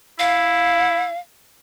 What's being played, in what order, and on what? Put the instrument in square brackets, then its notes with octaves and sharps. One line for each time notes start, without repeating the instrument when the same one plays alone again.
[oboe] E4 [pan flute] F5